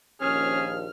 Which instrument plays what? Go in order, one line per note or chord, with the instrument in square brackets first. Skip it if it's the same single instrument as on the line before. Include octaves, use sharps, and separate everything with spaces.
[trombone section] A#1 D#2 F3 [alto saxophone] C#4 [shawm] G#4 [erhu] F6